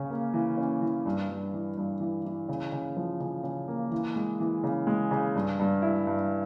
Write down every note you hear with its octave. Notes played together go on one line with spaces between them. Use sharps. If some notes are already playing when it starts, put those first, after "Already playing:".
Already playing: C#3 C#4
A#3
E3
C#4
E3
G2
G2
E3
G2
E3
E3
C#3
C#3
F3
C#3
C#3
A#3
E3
G#3
E3
C#3
G#3
C#3
G2
G2
E4
G2